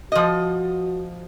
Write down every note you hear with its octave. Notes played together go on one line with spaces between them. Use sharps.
F3 F#4 D#5